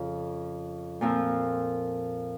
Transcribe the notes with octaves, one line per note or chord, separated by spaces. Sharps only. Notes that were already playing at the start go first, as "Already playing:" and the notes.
Already playing: F2 C#3 F3
A#2 F3 C4